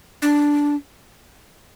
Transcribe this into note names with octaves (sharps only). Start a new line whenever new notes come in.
D4